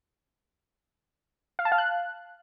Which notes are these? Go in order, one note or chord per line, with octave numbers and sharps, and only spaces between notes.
F5
A5
F5
F#6